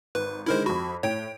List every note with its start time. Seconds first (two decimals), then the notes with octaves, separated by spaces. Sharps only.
0.15 G#1 B4
0.46 D3 D#3 G#3 E4 A#4 C5
0.66 F2 F#4 B5
1.03 A2 C#5 G5 D7